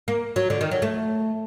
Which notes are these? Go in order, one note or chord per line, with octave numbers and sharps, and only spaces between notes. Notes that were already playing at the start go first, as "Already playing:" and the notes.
A#3
F#3
D3
D#3
F#3
A3